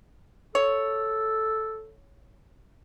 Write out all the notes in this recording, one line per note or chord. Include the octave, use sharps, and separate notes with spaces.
A4 C#5